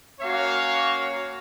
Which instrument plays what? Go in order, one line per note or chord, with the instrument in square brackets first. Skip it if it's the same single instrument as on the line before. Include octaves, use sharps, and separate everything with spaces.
[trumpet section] A#3 C#4 F#4 C#5 F5